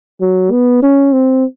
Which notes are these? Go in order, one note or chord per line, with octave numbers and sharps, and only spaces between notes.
F#3
B3
C#4
C4